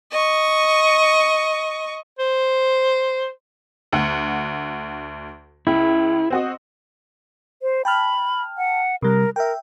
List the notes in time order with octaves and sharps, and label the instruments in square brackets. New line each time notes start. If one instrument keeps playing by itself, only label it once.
[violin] D#5 C#6
[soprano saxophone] C5
[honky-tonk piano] D2 F#5
[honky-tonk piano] C#2 [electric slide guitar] E4
[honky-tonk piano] C4 F#4 D#5
[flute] C5
[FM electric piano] G5 A5 F6 [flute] B5
[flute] F#5
[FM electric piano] C3 G3 [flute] A#4
[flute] A#4 [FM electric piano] E5 G5